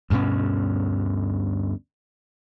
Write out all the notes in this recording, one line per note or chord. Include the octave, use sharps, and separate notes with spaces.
D2 G2 B2 C#4